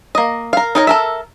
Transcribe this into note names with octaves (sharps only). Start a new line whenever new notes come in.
A#3 D#5
A#4 F5
D#4 A#4 C#5
A4 A#4 E5